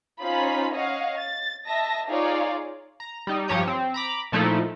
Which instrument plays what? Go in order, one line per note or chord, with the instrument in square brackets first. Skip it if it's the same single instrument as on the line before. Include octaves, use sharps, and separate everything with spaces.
[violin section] C#4 D#4 F4 C5 B5
C#5 D#5 F5 F#5
A6
D#5 E5 A5 A#6
D#4 F4 G#4 C#5 D5 F5
[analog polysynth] A#5
G3 D#4
G2 F3 G4 C#5 A#5 D#6
C4
A#5 B5 D6
A#2 F3 A3 D#4 E4 A4